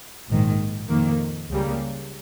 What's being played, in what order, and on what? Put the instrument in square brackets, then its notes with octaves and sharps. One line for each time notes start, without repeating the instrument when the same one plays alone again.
[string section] A#1 G#2 D#3
F2 D#3 A#3
C#2 C#3 G3 A#3